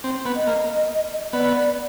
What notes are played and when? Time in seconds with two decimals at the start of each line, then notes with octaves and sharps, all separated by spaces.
0.04 C4
0.26 B3
0.36 D#5
0.47 A#3
1.33 B3 D5
1.55 D5